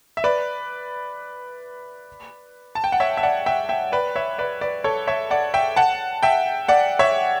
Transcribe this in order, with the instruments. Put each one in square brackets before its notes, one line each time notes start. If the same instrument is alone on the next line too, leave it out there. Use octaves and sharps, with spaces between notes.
[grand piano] E5
B4 D5
A5
G5
F#5
C#5 E5
E5
D5 F#5
E5 G5
E5 G5
B4 D5
C#5 E5
B4 D5
B4 D5
A4 C#5
C#5 E5
D5 F#5
E5 G5
F#5 A5
E5 G5
D5 F#5
C#5 E5